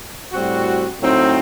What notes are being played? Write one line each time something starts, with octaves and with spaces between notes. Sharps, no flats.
A2 G3 C4 F#4
A2 F#3 C4 D#4